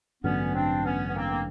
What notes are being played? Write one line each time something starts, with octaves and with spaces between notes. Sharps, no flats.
A1 G2 D3 F#3 B3 C#4
C4 D4
B3 C#4
B3
A#3 C4
A#3